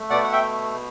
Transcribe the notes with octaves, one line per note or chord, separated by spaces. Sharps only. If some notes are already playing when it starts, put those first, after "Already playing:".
Already playing: A3
B2 D5 F#5
F#5
E5 G5